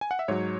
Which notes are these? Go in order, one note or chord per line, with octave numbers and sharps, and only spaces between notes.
G#5
F#5
E5
G#2 F#3 C#5